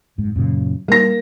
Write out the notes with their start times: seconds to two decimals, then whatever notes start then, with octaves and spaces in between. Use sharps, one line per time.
0.18 F#1 G#2
0.36 F#2 A#2 C#3
0.88 G3 A#3 A#6